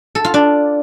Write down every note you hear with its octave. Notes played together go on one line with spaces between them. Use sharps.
A4
F4
D4